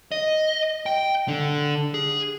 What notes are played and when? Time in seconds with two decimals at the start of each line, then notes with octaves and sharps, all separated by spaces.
0.12 D#5
0.86 G5
1.28 D3
1.94 G#4